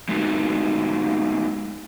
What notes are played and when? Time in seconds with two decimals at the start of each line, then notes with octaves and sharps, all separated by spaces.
0.09 G#3 A3 B3 D#4 F#4